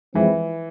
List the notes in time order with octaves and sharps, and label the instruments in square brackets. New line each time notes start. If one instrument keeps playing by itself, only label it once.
[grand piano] E3 [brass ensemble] F3 G#3 C4 E4